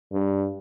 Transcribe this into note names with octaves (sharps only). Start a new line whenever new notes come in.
G2